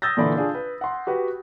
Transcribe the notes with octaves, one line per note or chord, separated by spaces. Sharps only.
D#6 E6 G6 A6 A#6
A#2 D3 E3 D5 B5
D4 F4 G#4
B4
F#5 C6
F#4 G4 B4 F#5